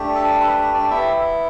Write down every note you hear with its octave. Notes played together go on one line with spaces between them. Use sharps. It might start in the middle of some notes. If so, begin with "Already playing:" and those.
Already playing: A3 D4 G4
A4 A5
B4
B4
D4 D5
B3 E4 G4 E5